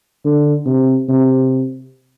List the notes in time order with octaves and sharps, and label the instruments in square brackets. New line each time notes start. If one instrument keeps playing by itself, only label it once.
[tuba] D3
C3
C3